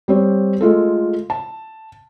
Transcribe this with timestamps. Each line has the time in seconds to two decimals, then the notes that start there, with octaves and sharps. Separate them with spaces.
0.08 G3 C4 C#5
0.61 G#3 A3 F4 A4
1.30 A5